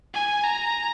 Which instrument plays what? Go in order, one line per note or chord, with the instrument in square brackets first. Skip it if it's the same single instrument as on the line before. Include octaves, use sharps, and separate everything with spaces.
[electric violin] G#5
A#5